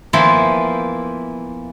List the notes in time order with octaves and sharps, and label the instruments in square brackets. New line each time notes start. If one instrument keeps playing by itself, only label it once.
[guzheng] E3 F3 A#3 B3 C5 E5